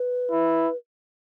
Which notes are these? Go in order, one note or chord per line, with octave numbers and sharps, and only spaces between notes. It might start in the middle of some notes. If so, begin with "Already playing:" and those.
Already playing: B4
E4